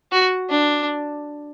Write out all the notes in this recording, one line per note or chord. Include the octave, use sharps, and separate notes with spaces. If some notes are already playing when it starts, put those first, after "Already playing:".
F#4
D4